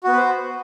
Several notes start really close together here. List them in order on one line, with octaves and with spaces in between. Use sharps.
F#4 B3 B4 C5